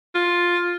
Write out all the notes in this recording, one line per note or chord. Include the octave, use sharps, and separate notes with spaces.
F4